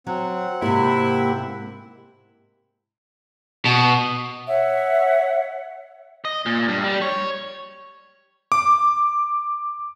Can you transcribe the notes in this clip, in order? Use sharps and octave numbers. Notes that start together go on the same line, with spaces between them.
F#3 C4 F#5
G#2 C3 A#3 E4 G4
B2
C#5 E5 F#5
D#5
A#2
G2
G3
C#5
D6